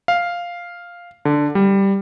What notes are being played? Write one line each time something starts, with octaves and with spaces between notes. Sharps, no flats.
F5
D3
G3